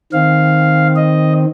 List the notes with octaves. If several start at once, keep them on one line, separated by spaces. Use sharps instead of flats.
D#3 C4 F5
D#5